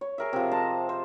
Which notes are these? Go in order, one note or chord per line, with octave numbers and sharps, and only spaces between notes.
C#5
G#4 A#4 E5
C3 F3
C5 D#5 A5 A#5
C5